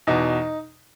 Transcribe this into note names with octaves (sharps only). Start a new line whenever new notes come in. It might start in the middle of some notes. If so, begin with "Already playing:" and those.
E2 B2 D#4